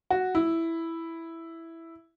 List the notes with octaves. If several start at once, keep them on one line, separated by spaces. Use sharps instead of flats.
F#4
E4